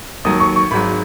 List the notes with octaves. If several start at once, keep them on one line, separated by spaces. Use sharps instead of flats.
D#2 D#3 F#3 D#6
C#6
C#6
G#1 G#2 F#3 B5